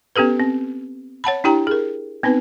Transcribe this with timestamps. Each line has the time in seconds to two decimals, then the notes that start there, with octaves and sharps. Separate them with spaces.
0.16 B3 C#4 G4 A4 B4
0.40 C4
1.24 C#5 F#5 A5 B5
1.44 D4 E4 G4 G5 A#5
1.67 G#4 A#4
2.23 B3 C4 D#4 B4